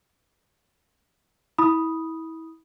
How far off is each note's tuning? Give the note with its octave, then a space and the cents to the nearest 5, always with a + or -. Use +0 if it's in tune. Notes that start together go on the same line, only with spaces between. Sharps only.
E4 -30 B5 -10 D#6 +0